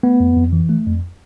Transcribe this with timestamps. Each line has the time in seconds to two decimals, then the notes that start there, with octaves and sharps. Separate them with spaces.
0.03 A3 B3
0.20 F2
0.36 F2
0.53 E3
0.69 A3
0.86 F2